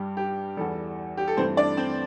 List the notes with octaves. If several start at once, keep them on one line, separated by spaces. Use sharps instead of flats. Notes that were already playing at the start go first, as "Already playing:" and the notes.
Already playing: G2 G3 G4
G4
E2 E3 G3 A4
G4
A4
G2 E3 A3 C4 C5
D4 D5
C4 C5